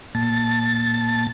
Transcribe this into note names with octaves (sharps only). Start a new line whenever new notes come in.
A#2 A5 A6